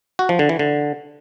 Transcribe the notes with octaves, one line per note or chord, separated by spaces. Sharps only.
F#4
F3
D3
E3
D3